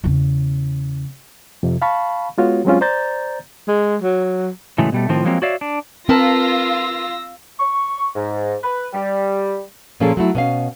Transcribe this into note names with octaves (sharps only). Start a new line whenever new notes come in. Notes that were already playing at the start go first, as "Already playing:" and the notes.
E2 C#3
F2 C3
F5 A5 B5 C#6
G#3 B3 F4 F#4 C#5
F#3 G#3 C4 C#4 F4
C5 D5 A#5 G6 A6
G#3
F#3
A2 C#3 E3 F#3 G#3 A3
B2 G3 A3
A2 D#3 F3 C4 F4
F3 F#3 G#3 A#3 C4 F4
F#4 C#5 D5 E5 F5
D4
C4 F4 A#4 B4 F5 A5 E6 A#6
C#6
G#2
B4
G3
A#2 F3 A#3 C#4 G#4 A4
F#3 A3 E4
B2 C#4 F5